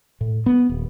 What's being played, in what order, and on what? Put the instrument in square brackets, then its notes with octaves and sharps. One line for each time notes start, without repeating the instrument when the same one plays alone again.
[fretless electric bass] A2
B3
D#1